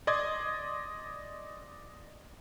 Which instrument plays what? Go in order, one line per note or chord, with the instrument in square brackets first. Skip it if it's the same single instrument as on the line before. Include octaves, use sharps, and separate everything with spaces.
[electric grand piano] D5 D#5 C6 G#6